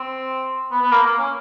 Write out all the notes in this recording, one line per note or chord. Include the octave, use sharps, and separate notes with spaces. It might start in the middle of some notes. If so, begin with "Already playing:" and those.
Already playing: C4
B3
B3
A#3
A#3
C#4